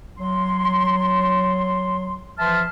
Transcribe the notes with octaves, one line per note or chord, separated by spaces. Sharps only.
F#3 C6
E3 F3 E5 A5 C6 F6